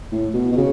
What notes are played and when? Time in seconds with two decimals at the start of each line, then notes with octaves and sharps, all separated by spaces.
0.12 A2
0.34 B2
0.52 B2
0.57 C#3